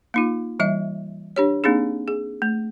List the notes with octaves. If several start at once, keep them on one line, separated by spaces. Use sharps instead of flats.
A#3 D#4 F4
E3 G3 D#5 E5
D4 G4 C#5
A#3 C4 D4 D#4 G#4
G#4
A3